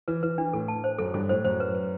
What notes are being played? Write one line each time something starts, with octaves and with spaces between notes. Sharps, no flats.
E3 B4
E3 B4
E3 D4
A2 A4
A5
C5
F#2 A4
G2 A4
A2 C5
F#2 C5
B4
B4